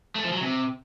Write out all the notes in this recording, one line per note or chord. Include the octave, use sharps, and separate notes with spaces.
A3
F3
F#3
C3